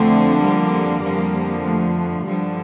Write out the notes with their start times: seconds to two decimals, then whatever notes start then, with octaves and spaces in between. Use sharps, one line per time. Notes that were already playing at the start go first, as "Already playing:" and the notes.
Already playing: F2 D3 F3 A3 C4
0.40 G3 A#3
1.00 F2 D3 F3
1.61 A3
2.22 G2 D3 F3 G3